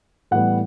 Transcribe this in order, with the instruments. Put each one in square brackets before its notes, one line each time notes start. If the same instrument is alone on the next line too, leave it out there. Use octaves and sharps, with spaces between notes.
[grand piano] A2 E3 G3 B3 F#5